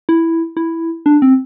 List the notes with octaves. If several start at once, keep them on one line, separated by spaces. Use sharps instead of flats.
E4
E4
D4
C4